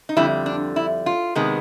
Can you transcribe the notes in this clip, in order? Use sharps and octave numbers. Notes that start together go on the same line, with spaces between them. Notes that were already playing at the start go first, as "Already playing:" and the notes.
D#4
F2 D3 G3 E4
D4
E4
F4
C3 D#3 G#3 B3